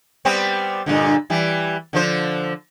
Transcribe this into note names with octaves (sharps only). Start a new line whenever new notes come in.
G3 B3 C4
G2 A#2 D3
E3 G3
D3 F3 C5